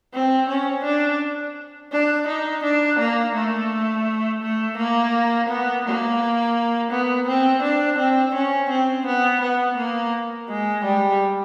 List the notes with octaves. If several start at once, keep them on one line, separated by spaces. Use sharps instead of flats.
C4
C#4
D4
D4
D#4
D4
A#3
A3
A3
A#3
B3
A#3
B3
C4
D4
C4
C#4
C4
B3
B3
A#3
G#3
G3